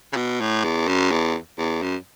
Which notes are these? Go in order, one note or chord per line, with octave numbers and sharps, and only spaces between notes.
C#3
B2
A2
E2
F#2
E2
E2
F#2